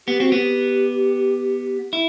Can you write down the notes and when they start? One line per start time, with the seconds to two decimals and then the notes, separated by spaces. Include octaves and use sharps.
0.08 B3 G4
0.20 C4 F#4
0.32 B3 G4
1.93 E4